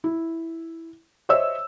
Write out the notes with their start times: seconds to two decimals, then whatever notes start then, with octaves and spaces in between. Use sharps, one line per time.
0.04 E4
1.29 C5 C#5 D#5 E5 E6